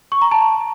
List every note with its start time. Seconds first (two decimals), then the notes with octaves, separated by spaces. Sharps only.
0.12 C#6
0.22 A#5
0.32 A5